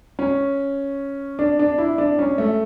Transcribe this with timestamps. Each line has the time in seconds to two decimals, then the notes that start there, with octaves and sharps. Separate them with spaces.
0.19 C#4
1.39 D4
1.59 D4
1.78 E4
1.98 D4
2.19 C#4
2.38 A3